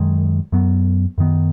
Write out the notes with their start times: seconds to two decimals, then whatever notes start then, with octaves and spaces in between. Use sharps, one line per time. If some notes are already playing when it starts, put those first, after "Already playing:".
Already playing: F#2 D#3 G#3
0.52 F#2 F#3 B3
1.18 F#2 D#3 B3